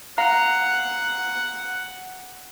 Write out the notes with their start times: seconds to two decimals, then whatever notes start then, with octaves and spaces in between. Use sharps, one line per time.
0.18 F5 F#5 A#5